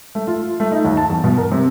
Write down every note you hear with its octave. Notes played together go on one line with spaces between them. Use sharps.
A3
F4
A3
D#4
D#2
A5
E2
B2
A#4
C3